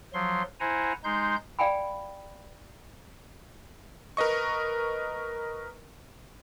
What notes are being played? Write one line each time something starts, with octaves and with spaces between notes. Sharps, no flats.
F3 F#3 C6
E4 C5 F#5 G#5 A#5
G#3 D#4 C6 G6
D5 F5 G5 G#5 B5
A#4 B4 D#5 C#6